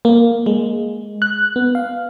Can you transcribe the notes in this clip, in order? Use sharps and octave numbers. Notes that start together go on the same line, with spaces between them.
A#3
G#3
F#6
B3
F5